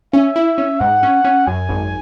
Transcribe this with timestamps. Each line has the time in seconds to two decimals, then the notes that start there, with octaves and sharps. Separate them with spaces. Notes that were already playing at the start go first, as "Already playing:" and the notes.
0.13 C#4 E5
0.36 E4
0.58 C#4
0.80 G#2 F#5
1.03 C#4
1.24 C#4
1.47 F#2 G#5
1.69 G#1